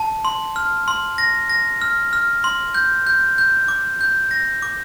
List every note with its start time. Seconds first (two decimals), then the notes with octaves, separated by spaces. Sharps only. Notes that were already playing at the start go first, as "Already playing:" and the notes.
Already playing: A5
0.25 C6
0.56 F6
0.88 C6
1.18 A#6
1.49 A#6
1.82 F6
2.13 F6
2.44 C6
2.74 G6
3.07 G6
3.38 G6
3.68 D6
4.01 G6
4.31 A#6
4.62 D6